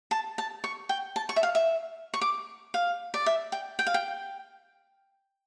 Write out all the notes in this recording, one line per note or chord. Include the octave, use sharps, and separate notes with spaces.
A5
A5
C#6
G5
A5
C#6
E5
F5
E5
C#6
D6
F5
D5
E5
G5
G5
F5
G5